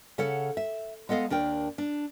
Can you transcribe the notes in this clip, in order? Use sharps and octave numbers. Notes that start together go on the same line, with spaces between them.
C#3 A4 C#5 F#5
E5
G#3 B3 A4 D#5 F5
D#2 D4 A#4 G5
D4